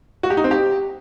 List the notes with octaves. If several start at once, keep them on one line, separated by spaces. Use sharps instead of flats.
F#4
G4
D#4
C4
G4